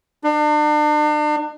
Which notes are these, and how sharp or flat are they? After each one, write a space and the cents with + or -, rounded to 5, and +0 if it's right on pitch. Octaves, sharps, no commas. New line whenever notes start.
D4 +40